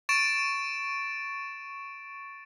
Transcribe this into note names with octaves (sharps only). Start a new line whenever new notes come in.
C#6 A6 D7 E7